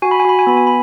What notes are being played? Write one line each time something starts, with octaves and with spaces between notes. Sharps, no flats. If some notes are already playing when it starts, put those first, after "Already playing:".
F#4 G#5
B5
G#5
F#4 B5
G#5
B3 B5
G#5
B5